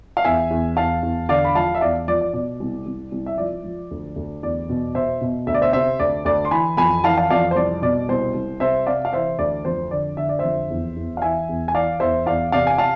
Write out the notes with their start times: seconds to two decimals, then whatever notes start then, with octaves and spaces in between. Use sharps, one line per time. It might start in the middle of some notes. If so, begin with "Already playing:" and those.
0.17 F5
0.25 E2 E5 G#5
0.51 E2
0.76 E2 F5 A5
1.03 E2
1.29 D3 D5 F5
1.45 B5
1.55 F3 F5 A5
1.75 E5
1.81 E2 D5 F5
2.08 F3 D5
2.21 D5
2.33 B2 D5
2.60 C2
2.86 C2
3.12 C2
3.26 E5
3.38 F3 D5
3.64 F3
3.91 D2
4.16 D2
4.43 E2 D5
4.69 B2
4.95 B2 C5 E5
5.21 B2
5.47 D2 E5
5.54 D5
5.62 C5 E5
5.73 C3 C5 E5
5.99 D2 D5
6.25 D2 D5
6.45 C6
6.51 E3 G#5 B5
6.77 F2 G#5 B5
7.04 E3 F5 A5
7.17 F5 A5
7.30 F2 D5 F5
7.51 C5
7.56 C2 D5
7.82 B2 D5
8.09 C2 C5
8.35 C2
8.60 C3 C5 E5
8.86 C3 D5 F5
9.05 F5
9.13 E3 C5 E5
9.39 D2 D5
9.65 F2 C5
9.91 D3 D5
10.17 D3 E5
10.29 D5
10.39 F2 C5 E5
10.70 E2
10.96 E2
11.17 F5
11.22 E3 E5 G#5
11.49 E2
11.68 G#5
11.75 E3 D5 F5
12.00 E2 C5 E5
12.26 E2 D5 F5
12.52 C3 D5 F5
12.67 G#5
12.78 F5 A5